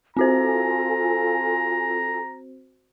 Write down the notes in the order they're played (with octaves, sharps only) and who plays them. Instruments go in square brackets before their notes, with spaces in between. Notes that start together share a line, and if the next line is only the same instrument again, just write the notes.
[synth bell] C4 F#4 C5 [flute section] F4 A4 G#5 [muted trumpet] A#5